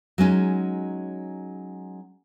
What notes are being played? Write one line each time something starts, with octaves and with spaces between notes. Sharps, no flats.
F#3 G#3 C#4 D#4